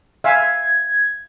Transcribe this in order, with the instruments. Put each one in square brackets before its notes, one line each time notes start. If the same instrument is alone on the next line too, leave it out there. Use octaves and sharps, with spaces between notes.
[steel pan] E5 F5 G#5 [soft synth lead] G#6